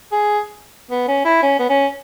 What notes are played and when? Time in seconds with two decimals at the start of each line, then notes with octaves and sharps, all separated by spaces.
0.12 G#4
0.90 B3
1.08 C#4
1.25 E4
1.43 C#4
1.59 B3
1.69 C#4